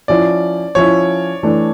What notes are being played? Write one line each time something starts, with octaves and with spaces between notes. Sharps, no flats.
F3 C#4 E4 D5
F3 C#4 E4 C#5
E3 A3 D4